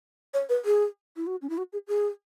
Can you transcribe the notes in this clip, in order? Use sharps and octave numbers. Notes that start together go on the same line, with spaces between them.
C#5
B4
G#4
E4
F#4
C#4
E4
F#4
G#4
G#4